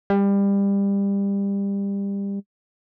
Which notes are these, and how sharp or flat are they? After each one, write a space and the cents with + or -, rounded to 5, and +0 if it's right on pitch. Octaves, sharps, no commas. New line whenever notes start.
G3 +25